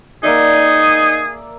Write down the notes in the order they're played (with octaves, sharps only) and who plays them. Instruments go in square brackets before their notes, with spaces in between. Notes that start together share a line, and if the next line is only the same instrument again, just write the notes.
[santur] A#3 D5 E5 [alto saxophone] D#4 [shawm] G#4